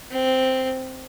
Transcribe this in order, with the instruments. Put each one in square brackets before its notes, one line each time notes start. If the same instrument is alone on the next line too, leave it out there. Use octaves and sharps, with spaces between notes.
[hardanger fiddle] C4